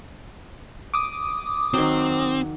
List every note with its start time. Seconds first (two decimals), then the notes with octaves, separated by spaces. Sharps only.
0.94 D6 D#6
1.74 D#3 F#3 C4